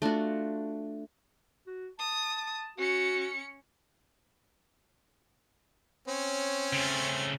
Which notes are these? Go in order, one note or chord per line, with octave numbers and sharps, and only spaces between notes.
A3 D4 F4 F#4
F#4
A5 D#6
C#4 F#4 C#7
C4 C#4 C#5
C#3 A3